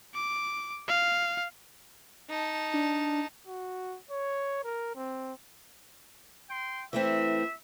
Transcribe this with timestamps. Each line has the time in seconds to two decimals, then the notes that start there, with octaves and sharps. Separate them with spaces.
0.14 D6
0.88 F5
2.29 D#4 A5
2.74 D4
3.47 F#4
4.11 C#5
4.64 A#4
4.96 C4
6.50 G5 C6
6.93 E3 A3 C4 E5